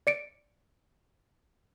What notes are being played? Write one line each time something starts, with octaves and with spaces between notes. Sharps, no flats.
D5 C#7 D7